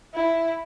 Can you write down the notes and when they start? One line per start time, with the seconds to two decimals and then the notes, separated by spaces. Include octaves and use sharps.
0.14 E4